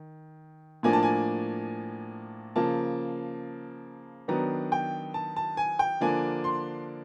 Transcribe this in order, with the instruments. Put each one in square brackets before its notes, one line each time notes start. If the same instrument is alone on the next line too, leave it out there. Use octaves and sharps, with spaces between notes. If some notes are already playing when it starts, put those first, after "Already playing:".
Already playing: [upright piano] D#3
A2 F3 A#3 D4 G#5
A5
G#5
C#3 F3 A#3 A5
D#3 F#3 B3 D4 A#5
G5
A5
A5
G#5
G5
D3 F3 A#3 D4 G#5
C6